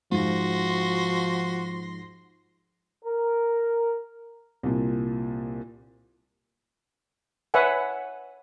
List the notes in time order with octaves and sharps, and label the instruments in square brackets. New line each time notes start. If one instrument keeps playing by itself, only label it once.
[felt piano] G#2 [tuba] F3 [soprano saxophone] F#4 [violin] C6 A#6
[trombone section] A#4
[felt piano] C2 A#2
[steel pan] B4 C#5 E5 F#5 G#5